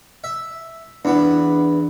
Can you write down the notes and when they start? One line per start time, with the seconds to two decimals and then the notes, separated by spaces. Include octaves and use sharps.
0.24 E5
1.05 E2 B3 D4 B4